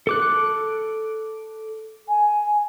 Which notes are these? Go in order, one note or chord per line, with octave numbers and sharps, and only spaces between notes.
A4 D6 F#6
G#5